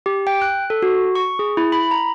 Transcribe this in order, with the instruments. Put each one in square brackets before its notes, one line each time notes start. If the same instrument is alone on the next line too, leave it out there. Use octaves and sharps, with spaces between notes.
[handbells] G4
G5
F#6
A4
F#4
C#6
G#4
E4
B5
A#5